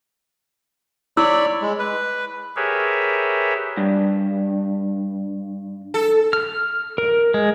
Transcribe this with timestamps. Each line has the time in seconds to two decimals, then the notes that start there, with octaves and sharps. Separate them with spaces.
1.17 E4 C#5 D5 B5 E6
1.62 G#3
1.79 B4
2.56 G4 G#4 A#4 B4 C#5 E5
3.77 G2
5.94 A4
6.33 F6
6.98 A#4
7.34 G#3